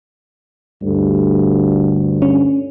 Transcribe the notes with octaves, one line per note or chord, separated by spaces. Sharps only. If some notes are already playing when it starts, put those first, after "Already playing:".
D2 G2
C#4